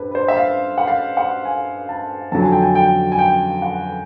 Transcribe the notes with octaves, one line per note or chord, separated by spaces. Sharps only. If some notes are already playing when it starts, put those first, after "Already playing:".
Already playing: G2 B4 C5
B4
C5
E5
F5
F#5
F5
F#5
G#5
A5
F2 D3 F#3 A5
G#5
G5
G#5
G5
G#5
G5
F#5